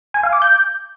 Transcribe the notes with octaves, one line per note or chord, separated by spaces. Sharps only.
G#5
F5
D6
G6